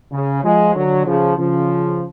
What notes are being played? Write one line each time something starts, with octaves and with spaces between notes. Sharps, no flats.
C#3
F3 G#3
D3 F#3
C#3 F3
C#3 F3